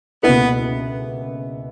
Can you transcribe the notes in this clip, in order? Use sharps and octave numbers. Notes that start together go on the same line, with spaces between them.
C#2 B2 A#3 B3 E4 B4